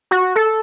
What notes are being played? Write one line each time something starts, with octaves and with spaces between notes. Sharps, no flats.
F#4
A4